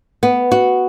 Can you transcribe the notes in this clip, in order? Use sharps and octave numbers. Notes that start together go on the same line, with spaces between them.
B3
F#4